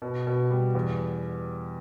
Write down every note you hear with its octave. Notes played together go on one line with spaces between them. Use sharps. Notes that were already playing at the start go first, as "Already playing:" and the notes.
B2
B2
G3
E2